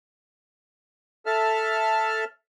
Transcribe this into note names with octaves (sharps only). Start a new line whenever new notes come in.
A4 E5 A5 F6